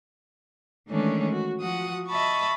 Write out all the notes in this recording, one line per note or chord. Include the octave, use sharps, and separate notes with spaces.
D#3 E3 G#3 A3 C#4 D4
F#4
F3 F#4 F#5 D#6
D#5 E5 A5 B5 C#6